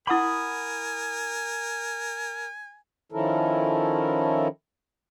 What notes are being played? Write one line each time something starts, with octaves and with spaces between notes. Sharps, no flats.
E4 A#4 F#5 G#5 B5 D6 D#6
D#3 F3 C#4 E4 A4 A#4